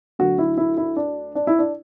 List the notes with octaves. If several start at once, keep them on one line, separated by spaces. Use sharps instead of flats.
D2 D3 F#3 F#4
E4
E4
E4
D4
D4
E4
D4